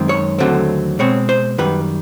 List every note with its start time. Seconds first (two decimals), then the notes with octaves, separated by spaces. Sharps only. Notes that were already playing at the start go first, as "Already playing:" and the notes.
Already playing: F#2 D#3 G#3 C4
0.09 C#5
0.39 D#2 D3 F#3 A3 C4
0.99 B2 G#3 C4 C#5
1.29 C5
1.58 F#2 D#3 G3 B4